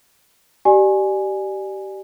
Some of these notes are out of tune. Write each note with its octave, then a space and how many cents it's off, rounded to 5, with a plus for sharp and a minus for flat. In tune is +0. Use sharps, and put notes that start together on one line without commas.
G4 -25 D5 +30 G#5 +0